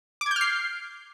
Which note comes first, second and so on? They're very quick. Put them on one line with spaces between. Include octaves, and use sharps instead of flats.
D6 G#6 G6 F6 C7